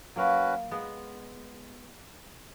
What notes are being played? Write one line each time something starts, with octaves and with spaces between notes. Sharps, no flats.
F#3 A#3 C#4 F#4 B4
G#3 B3